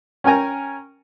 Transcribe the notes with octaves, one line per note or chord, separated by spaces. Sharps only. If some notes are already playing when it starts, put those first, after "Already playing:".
C#4 A#4 G5 G#5 A#5